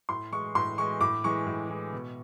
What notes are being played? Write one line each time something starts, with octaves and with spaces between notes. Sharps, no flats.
A2 C6
E3 G#3 C#6
A2 C6
E3 G#3 C#6
A2 D6
E3 G#3 C#6
A2
E3 G#3
B2